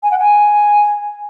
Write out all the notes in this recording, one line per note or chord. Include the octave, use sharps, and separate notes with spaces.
G#5
F#5
G#5